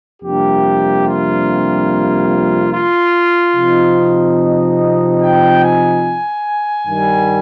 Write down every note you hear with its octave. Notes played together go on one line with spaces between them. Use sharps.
F2 C3 G3 A#3 D4 G4
F4
F4
C3 F3 C4 D#4
D#5
G5
G#5
G2 D#3 G3